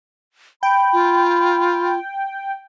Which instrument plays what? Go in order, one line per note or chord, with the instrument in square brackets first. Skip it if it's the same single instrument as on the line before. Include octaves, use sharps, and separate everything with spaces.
[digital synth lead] G5 [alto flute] B5
[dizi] F4